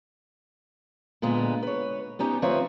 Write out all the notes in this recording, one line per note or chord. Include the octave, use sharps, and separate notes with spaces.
A#2 D3 G#3 B3 G#4
B4 C#5
B3 C#4 D#4 G4
D2 F3 C4 B4 C#5 E5